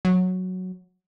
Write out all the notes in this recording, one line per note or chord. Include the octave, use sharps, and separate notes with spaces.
F#3